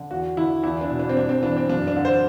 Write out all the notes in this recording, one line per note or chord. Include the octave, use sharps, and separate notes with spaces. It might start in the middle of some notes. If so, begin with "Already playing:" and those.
Already playing: D3
E2 F#4
D3 E4
E2 E4
D4
B2
D4
C4
G2 D4
C4
E3 D4
C4
F#2 D4
D4
D3
C5